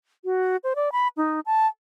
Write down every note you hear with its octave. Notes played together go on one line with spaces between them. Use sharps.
F#4
C5
D5
B5
D#4
A5